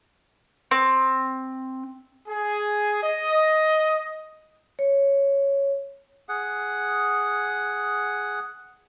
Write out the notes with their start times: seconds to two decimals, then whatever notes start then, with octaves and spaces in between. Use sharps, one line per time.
0.71 C4
2.28 G#4
3.03 D#5
4.79 C#5
6.29 G#4 F#5